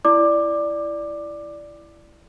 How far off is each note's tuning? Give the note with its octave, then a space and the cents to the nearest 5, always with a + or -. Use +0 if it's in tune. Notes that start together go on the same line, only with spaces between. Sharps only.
E4 +15 D5 +0 D6 +15